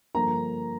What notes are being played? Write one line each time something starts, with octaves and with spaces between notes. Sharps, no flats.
G2 D3 F3 A#3 A#5